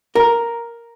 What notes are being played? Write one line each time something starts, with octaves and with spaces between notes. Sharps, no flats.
A#4